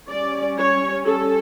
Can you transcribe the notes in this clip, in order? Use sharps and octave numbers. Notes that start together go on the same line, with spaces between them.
G3 C#4 D5
C#5
A4